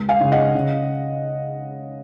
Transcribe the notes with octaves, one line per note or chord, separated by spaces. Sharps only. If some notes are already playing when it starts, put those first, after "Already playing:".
Already playing: C#2
F5 G#5
C#3 G#3
D#5 F#5
C#3